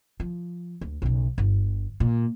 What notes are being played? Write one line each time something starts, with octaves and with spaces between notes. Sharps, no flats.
F3
D2
B1 C#3
G1
A#2